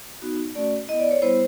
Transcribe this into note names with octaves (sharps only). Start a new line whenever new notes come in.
B3 D#4 F#4
A3 C#4 F#4 D5
B3 E4 D#5
D5
C#5
G3 B3 E4 C5